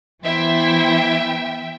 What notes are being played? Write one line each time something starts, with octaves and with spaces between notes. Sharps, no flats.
E3 B3 E4 C5 E5 G5